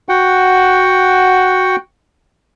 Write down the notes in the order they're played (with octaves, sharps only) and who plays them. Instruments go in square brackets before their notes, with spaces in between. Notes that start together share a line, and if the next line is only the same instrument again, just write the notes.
[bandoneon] F#4 F#5 G5